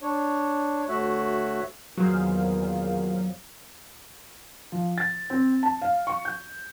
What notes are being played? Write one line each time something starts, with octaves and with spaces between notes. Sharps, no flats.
D4 C#5
D2 A3 F#4 C#5 E5 F#6
E2 A#2 D#3 F#3 G#4 C5 F5
F3
A6
C4
A5
F5
C#6
G6